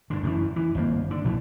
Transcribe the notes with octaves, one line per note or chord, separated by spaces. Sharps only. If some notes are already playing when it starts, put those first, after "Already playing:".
G2 D3
F#2 D#3 E3
E3
G#1 G2 A#3
D3
A#1 B2 E3